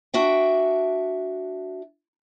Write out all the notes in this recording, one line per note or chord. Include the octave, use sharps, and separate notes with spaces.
D4 F#4 E5 G5